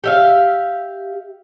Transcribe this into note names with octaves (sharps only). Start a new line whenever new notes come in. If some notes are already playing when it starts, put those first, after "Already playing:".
G4 E5 F5